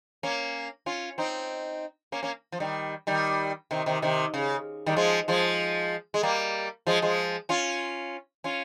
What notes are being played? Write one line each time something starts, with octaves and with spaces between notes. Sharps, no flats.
A#3 C#4
C#4 F4
C4 D#4
A#3 C#4
A#3 C#4
F3
D#3 G3
D#3 G3
C3 D#3
C3 D#3
C3 D#3
C#3
D#3 G3
F3 G#3
F3 G#3
G#3
G3 A#3
F3 G#3
F3 G#3
C#4 F4
C#4 F4